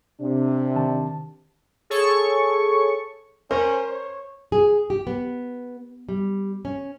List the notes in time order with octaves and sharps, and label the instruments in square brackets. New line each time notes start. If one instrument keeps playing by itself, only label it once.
[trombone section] C3 [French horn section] D4
[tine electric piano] D#3 A5
[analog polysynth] G#4 A4 C#5 C#6
[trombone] C#4 [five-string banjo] A#4 [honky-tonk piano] C5
[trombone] C#5
[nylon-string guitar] G#4
G4
B3
G3
C#4